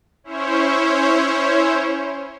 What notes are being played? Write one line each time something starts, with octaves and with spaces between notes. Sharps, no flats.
C#4 E4 C5 C#5